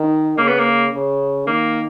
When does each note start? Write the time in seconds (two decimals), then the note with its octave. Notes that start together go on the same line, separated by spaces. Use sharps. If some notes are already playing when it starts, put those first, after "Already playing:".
Already playing: D#3
0.38 C#3 A#3
0.48 B3
0.59 A#3
0.93 C#3
1.47 D#3 A#3